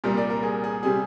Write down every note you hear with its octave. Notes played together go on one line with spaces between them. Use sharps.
C2 A#2 G3 A#4
D5
A#4
G#4
G#4
C3 G3 G#4